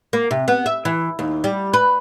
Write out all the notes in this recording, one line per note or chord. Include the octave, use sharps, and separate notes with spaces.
A#3
C3
B3
E5
E3
D#2
G3
B4